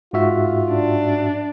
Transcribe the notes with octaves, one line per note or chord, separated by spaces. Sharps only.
G#2 F4 F#4 E5
D4